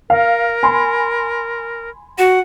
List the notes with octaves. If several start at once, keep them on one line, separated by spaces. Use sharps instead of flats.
A#4 F5
G#5 B5 C6
F#4 F#5